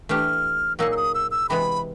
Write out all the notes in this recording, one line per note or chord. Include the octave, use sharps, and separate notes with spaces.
E3 A3 D4 G4 F6
A#2 F#3 A#3 D#4 G#4 E6
E6
D#6
E6
E6
C3 E3 G#3 B3 B5